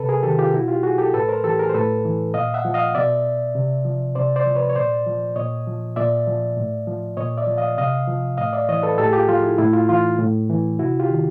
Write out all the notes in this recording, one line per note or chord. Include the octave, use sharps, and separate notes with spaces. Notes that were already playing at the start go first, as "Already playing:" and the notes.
Already playing: C3 A4 B4
G#4 A#4
D#3 G4 A4
F4 G4
B2 E4 F#4
F4 G4
F#4 G#4
G4 A4
A2 A4 B4
A#4 C5
E3 G4 A4
G#4 A#4
C5
A2 A4 B4
E3
A#2 D#5 F5
E5 F#5
F3
D#5 F5
B2 D5 E5
C3
F3
C3 C5 D5
C5 D5
F3
B4 C#5
C#5
A#2 C5 D5
F3
A#2 C#5 D#5
F3
A#2 D5 E5
F3
A2
F3
A#2 C#5 D#5
D5 E5
F3
D#5 F5
C3 D#5 F5
F3
A2 D#5 F5
D5 E5
E3 C#5 D#5
A4 B4
A2 G4 A4
G#4
F4 G4
F3 F4
E4
A2 E4
F4
E3 F4
A2
E3
C3 E4 F#4
F4 G4
D#3